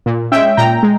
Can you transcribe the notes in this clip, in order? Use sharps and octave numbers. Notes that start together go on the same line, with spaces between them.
A#2
G#3 C#4 E5 G5
A#2 G5 A#5
G#3